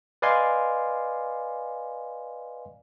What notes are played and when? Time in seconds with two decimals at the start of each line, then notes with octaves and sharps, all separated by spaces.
0.22 B4 D5 D#5 F5 G#5 C6